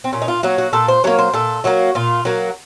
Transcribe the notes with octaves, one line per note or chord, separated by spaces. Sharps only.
C4
A#2 C#4
D#4
F4
F#3 A#3 F#4
F#4
A#2 A4
C5
F#3 A#3 C#5
C5
A#2 A4
F#3 A#3 F#4
A#2 F4
F#3 A#3 F#4